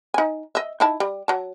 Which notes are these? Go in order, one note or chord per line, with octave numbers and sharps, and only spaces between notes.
D#4 G#5
D#5 E5
D#4 E4 A5
G3
F#3 A5